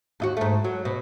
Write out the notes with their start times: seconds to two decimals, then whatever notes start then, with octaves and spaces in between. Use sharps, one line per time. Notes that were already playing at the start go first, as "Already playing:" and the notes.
0.20 D#2 D#4 F#4
0.37 G#2 A3
0.64 F#3
0.85 B2